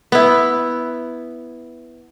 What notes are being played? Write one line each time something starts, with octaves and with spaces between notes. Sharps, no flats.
B3 E4